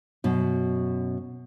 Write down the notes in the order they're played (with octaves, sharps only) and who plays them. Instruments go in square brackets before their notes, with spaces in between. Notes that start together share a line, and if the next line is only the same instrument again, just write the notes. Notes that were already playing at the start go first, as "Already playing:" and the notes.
[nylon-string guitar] F#2 B2